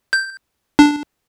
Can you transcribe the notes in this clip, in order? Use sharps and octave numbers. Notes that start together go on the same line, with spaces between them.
G6
D4